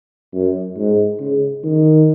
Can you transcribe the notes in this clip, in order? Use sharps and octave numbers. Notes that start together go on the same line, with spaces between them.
F#2
G#2
C#3
D#3